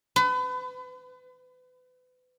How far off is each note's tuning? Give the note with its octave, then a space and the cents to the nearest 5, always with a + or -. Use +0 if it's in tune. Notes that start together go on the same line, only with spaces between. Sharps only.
B4 +35